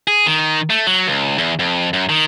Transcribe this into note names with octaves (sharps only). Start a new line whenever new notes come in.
G#4
D#3
A3
F#3
C#2
E2
F2
F#2
D#3